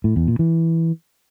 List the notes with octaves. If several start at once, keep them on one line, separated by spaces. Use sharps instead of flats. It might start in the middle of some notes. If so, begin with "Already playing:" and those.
A2
E2
A#2
E3